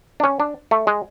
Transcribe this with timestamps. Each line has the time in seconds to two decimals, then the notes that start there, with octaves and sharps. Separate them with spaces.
0.20 D4
0.24 C#4
0.40 D4
0.71 A3
0.87 G#3